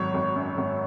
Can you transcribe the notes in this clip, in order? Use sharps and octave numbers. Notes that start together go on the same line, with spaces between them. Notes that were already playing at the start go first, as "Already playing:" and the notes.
Already playing: G#1 F#3 C#5
G#1
F#2
G#1